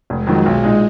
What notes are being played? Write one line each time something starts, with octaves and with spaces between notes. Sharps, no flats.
F1 G#3
F2 D#3 F#3
B1
A#2 G#3 D#4